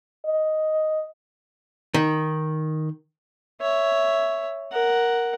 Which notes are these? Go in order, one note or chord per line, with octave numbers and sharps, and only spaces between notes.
D#5
D#3
C#5 E5
A#4 F#5